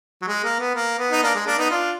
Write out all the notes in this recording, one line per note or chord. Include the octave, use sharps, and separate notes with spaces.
F#3
G#3
A#3
B3
A#3
B3
D#4
A#3 D4
G#3
A#3 D4
B3 D#4
D4 F4